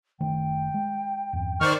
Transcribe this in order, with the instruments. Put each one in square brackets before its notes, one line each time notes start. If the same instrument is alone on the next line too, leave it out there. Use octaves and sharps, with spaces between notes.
[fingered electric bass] F#1 D#3 A3 [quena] G5
[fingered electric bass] G#3
E2 G2
[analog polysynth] D#3 C5 D5 [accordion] C#6 F6